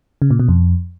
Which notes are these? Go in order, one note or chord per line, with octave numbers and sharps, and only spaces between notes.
C#3
A#2
B2
F2